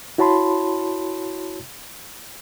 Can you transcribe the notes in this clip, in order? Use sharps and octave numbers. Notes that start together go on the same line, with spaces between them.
E4 F#4 C#5 A5 B5 C6